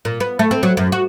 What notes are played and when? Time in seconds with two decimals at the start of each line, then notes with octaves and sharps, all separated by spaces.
0.05 A#2
0.20 B3
0.39 A3
0.51 C4
0.63 F#3
0.77 F#2
0.92 F#4